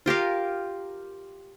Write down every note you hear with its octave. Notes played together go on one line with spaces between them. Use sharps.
F4 G4 A#4 F5